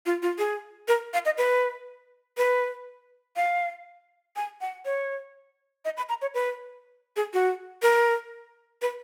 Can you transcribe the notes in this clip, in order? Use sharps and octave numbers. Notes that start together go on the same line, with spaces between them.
F4
F4
G#4
A#4
F5
D#5
B4
B4
F5
G#5
F#5
C#5
D#5
B5
A#5
C#5
B4
G#4
F#4
A#4
B4